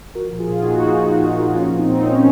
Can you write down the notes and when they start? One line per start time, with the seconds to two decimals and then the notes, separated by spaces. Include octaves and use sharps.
0.15 F3 F#4 A#4
0.32 A#2
0.39 F4 G#4
0.50 A#2
0.62 D#4 F#4
0.68 A#3
0.85 F3
1.02 A#2
1.21 A#2
1.37 A#3
1.55 F3 C#4 F4
1.73 A#2
1.79 C4 D#4
1.90 A#2
2.02 C#4
2.08 A#3